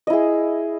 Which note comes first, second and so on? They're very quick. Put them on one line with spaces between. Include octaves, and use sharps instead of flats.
D#5 E4 G#4